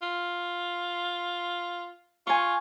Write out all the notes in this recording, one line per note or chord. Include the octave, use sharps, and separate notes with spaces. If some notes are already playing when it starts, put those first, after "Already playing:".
F4
F4 G#5 C#6